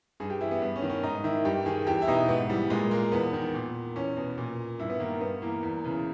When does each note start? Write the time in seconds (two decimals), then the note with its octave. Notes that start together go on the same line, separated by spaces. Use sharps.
0.20 G2 G#4
0.30 G4
0.41 E3 E4
0.51 B3
0.62 G2 B3
0.76 C#4
0.82 D#3
0.89 C#4
1.03 G#2 D#4
1.24 D#3 E4
1.45 G2 G4
1.66 D#3 G#4
1.87 E2 G4
2.02 E4
2.08 B2 D#4
2.29 G#2 B3
2.50 E3 G3
2.70 A#2 G#3
2.91 A#3
3.12 E2 B3
3.33 D#3
3.54 A#2
3.96 E2 C#4
4.17 B2
4.38 A#2
4.79 G2 E4
4.90 B3
5.00 D#3 A#3
5.21 G2 B3
5.42 E3 A#3
5.63 E2
5.84 C#3 E3